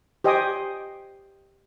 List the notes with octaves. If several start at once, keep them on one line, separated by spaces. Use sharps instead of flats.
G4 C5 D#5 G5 G#5 D#6